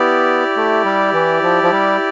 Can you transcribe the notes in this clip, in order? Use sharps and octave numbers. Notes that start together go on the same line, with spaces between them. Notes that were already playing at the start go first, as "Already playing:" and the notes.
Already playing: B3 E4 G4 D5
A3
G3
E3
F3
F3
G3